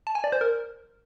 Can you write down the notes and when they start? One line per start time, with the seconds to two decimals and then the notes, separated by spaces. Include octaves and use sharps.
0.07 A5
0.15 G#5
0.24 D5
0.32 C5
0.41 A#4